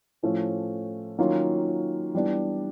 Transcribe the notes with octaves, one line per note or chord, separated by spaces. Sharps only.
A2 F3 A3 C#4
D#3 F#3 A#3 C#4 F4
E3 G3 B3 D4